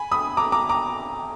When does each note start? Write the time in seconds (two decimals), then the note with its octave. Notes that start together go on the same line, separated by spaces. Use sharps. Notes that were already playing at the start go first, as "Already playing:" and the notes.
Already playing: G#5 B5
0.12 B5 D#6
0.37 A#5 D6
0.52 A#5 D6
0.69 A#5 D6